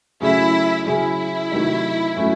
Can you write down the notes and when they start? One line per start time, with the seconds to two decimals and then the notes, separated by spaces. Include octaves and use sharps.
0.21 C#3 F#3 A3 C#4 E4 G#4
0.86 C#3 F#3 C#4 E4 G#4
1.51 C3 D#3 F#3 A3 D#4
2.16 F#3 A3 C#4